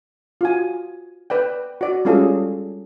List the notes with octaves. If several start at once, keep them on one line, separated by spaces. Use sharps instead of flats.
F4 F#4 G#5
B4 D5 G5
F#4 D5
G3 G#3 C#4 F4 G#4 A4